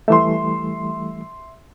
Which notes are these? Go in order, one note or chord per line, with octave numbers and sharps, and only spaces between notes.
E3 G3 A3 E5 C6